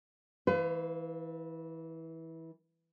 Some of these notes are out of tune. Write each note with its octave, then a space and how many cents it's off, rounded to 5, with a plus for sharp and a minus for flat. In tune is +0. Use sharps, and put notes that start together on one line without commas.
E3 -20 B4 +40 F5 +0